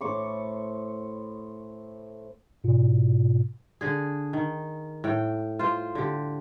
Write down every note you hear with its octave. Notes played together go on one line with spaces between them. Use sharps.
A2 C5 C#6 D6
G#2 B2 F4
D3 G#4
D#3
A2 G5
F4 C5
D3 G4